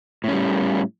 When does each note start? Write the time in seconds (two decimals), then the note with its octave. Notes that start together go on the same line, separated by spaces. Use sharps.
0.24 A2
0.28 C#4
0.32 G3